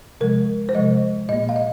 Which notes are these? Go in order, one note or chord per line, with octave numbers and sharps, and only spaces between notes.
C3 F3 G#3 A#4
C5
C3 F3 G#3 D#5
A#2 A#3 D#5
F5
D#5